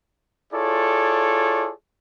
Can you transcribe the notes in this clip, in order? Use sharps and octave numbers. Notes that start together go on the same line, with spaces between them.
E4 F4 G#4 A4 C#5 D5